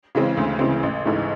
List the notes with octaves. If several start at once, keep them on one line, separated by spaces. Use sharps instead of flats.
C#3 E3 G#3 C4
D2
C#3 E3 G#3 C4
A1
G#2 E3 A3